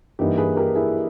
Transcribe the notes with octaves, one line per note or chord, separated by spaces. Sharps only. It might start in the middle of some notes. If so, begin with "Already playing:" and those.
G2 E3 A#3 D#4 G4
G#4 B4
G4 A#4
E4 G#4